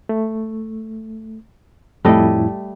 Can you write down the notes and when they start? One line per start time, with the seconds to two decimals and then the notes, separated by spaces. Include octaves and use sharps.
0.09 A3
2.05 F2 A2 G3 A3 E4 D#5